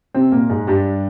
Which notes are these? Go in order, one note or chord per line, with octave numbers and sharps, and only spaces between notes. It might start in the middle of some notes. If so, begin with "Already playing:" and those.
C3 C4
A#2 A#3
G#2 G#3
G2 G3